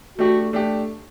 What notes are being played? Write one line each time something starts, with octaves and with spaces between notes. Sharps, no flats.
A3 D4 F#4 G4
A3 D4 G4